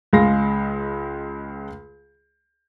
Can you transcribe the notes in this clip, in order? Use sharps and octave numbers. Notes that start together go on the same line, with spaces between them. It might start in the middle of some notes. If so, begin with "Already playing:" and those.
C#2 G#3 F5 A#6